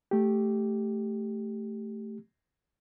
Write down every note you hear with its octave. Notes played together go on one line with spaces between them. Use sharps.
A3 G4